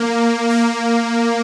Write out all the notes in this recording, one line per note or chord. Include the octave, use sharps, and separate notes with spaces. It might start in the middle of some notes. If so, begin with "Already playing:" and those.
Already playing: A#3
A#3